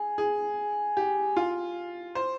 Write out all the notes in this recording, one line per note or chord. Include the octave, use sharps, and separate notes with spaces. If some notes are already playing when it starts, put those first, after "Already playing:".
Already playing: G#4
G#4
G4
F4
C5